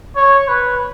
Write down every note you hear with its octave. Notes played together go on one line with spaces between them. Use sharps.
C#5
B4